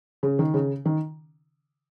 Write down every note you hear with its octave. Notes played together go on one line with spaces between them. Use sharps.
C#3
D#3
C#3
D#3